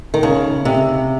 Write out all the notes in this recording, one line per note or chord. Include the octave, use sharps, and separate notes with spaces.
D#3
C#3
C3